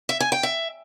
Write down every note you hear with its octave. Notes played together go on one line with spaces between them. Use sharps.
E5
G#5
G5
E5